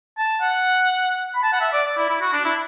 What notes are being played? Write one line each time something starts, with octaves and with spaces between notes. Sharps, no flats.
A5
F#5
B5
A5
F#5
E5
D5
D5
E4
E4
F#4
D4
E4